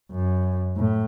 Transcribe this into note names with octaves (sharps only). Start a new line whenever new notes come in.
F#2
A2